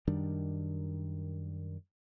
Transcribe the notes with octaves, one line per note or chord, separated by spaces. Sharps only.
F#2 D#3 G3 D4